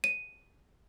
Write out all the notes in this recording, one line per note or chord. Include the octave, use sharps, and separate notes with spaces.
D#7